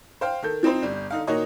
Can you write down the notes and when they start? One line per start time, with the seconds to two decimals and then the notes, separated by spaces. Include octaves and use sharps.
0.21 C5 F5 G5
0.42 D#3 A4 G6
0.63 F3 C4 D#4 C5
0.82 G1 G3
1.11 D3 D#4 F5
1.27 A#2 D#3 D#4 F#4 C#5 D#5